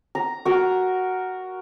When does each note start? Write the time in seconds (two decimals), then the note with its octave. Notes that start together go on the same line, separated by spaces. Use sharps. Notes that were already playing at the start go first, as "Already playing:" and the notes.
0.15 A#5
0.45 F#4 A#4